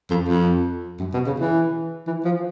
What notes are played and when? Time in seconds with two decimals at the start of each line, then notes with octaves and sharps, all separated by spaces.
0.11 F2
0.29 F2
1.00 F#2
1.14 B2
1.27 C#3
1.40 E3
2.07 E3
2.25 F3